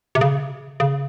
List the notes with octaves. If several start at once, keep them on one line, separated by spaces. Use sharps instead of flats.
C3
C#3
C#3